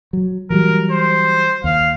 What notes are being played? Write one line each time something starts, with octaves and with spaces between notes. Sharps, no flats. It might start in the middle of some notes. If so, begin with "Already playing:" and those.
F#3
E3 F#3 G3 A#4
C5
D#2 F5